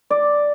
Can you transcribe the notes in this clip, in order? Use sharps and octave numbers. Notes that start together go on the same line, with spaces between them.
D5